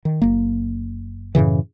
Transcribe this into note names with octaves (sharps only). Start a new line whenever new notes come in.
D#3
F#1 A#3
F#2 A2 C#3 E3